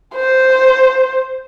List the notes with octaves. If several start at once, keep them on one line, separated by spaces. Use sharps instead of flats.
C5